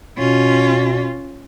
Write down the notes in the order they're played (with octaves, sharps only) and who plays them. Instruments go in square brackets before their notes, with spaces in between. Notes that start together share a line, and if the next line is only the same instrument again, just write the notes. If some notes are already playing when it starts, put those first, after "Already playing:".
[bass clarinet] B2 [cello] C#4 F4